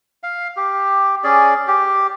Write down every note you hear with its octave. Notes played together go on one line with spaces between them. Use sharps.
F5
G4
C#4 G#4 D5
G4